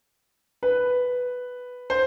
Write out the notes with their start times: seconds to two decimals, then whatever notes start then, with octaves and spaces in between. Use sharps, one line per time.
0.63 B4
1.90 C5